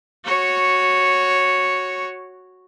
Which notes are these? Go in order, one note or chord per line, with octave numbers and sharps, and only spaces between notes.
F#4 C#5